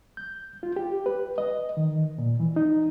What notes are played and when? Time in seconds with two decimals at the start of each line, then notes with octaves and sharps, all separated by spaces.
0.17 G6
0.63 F4
0.76 G4
1.06 B4
1.38 D#5
1.77 D#3
2.18 A#2
2.40 E3
2.56 D#4